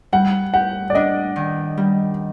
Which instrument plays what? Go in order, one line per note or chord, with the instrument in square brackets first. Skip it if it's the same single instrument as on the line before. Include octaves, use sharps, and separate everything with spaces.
[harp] G3 [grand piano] F#5
[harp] G4 [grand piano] F#5
[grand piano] D5
[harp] D4 [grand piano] D#5
[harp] D#3
G3